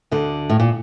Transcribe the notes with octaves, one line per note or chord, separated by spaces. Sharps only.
D2 D3
A2
A#2